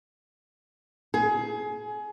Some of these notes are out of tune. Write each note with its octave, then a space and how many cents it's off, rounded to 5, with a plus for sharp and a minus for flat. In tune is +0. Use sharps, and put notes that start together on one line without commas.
G#4 +25